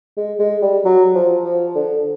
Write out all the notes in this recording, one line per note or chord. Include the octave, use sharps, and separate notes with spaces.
G#3
G#3
G3
F#3
F3
F3
D3